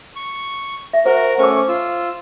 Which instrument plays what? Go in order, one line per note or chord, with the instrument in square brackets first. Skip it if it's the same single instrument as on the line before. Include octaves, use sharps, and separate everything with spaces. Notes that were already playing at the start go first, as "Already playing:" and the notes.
[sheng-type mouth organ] C#6
[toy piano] E5
[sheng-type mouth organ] F#4 A#4 [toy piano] C5
[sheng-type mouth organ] A3 C#4 C#6 [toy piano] C5 D6
[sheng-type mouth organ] F4 E6